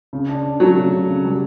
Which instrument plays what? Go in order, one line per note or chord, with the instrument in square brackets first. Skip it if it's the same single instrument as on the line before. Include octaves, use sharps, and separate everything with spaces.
[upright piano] C#3
D4
D4
[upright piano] C#3 [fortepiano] F#3 A3
[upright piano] C#3
C#3
C#3
G3